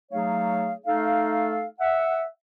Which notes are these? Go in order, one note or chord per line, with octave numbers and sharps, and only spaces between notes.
F#3 A3 D#4 G#4 C#5 F5
A3 D#4 A4 F5
E5 F#5